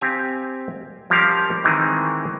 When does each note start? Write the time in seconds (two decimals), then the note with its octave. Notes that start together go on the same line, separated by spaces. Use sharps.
0.01 C4 G4 F5 G#5
1.10 F3 G3 C#4 A#4 F5
1.64 D#3 E3 G#3 C4